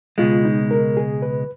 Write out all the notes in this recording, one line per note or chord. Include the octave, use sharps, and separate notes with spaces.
C#2 B2 G#3 F4
D#4
A#4
G#4
B4